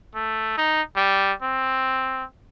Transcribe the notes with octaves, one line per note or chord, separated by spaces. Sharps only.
A3
D#4
G3
C4